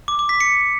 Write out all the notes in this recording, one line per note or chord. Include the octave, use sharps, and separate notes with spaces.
D6
D6
B6
C#7